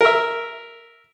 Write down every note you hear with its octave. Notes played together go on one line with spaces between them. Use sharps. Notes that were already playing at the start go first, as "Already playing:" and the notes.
A#4 E5